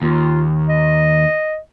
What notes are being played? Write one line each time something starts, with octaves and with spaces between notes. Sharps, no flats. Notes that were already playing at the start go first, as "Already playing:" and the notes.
D#2 F4
D#5